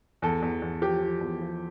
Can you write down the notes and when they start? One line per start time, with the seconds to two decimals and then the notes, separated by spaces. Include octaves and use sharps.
0.22 E2 A4
0.42 E2
0.62 E2
0.81 F3 G4
1.02 F3
1.21 E2
1.41 F3